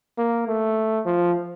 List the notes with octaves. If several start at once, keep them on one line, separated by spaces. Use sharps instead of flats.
A#3
A3
F3